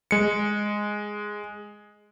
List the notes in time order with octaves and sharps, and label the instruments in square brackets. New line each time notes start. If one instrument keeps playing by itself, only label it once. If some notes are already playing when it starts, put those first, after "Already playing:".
[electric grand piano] G#3 C#7